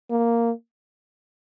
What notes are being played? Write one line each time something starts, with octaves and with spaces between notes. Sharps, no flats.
A#3